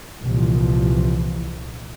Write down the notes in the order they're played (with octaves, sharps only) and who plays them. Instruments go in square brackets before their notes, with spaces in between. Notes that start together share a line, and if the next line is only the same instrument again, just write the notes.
[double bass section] C2 A#2 E3 F3